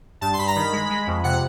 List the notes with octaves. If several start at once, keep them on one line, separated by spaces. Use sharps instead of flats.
G2 A5
C6
G2 B5
A#5
D#3 B5
G#3
G#3
F2
C3 F#5